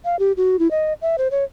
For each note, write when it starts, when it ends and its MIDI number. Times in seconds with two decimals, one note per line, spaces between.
0.05 0.19 77
0.19 0.32 67
0.37 0.59 66
0.59 0.70 64
0.71 0.93 75
1.02 1.16 76
1.18 1.28 72
1.31 1.44 73